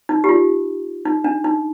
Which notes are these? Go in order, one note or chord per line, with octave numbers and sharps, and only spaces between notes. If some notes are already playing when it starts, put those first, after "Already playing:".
D#4
G4
F4
D#4
D4
D#4